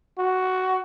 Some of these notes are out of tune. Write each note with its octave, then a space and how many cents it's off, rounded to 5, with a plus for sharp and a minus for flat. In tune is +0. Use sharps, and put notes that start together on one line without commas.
F#4 +10